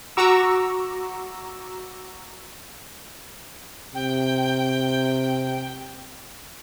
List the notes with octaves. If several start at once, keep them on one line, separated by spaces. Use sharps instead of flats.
F#4 A#5 C#6 D6 E6
C3 G5